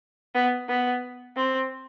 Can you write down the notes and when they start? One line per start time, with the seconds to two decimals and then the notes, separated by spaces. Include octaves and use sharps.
0.35 B3
0.69 B3
1.36 C4